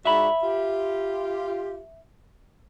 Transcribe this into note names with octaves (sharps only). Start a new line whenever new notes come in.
G#2 F#4 D5 E5 B5
F4 G4